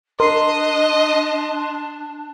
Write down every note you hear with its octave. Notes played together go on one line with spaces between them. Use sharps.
D4 A#4 D#5 C6 C7